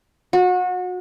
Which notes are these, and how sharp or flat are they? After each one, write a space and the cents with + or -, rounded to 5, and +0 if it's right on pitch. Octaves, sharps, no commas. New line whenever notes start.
F#4 -30